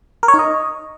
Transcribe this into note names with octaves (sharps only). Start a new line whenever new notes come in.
A#4
C#5
D#4
D#5